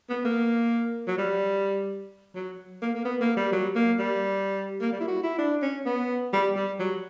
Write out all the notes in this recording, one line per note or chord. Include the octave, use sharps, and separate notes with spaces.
B3
A#3
F#3
G3
F#3
A#3
A#3
B3
A#3
G3
F#3
A#3
G3
A#3
G3
E4
F#4
E4
D4
C#4
B3
G3
G3
F#3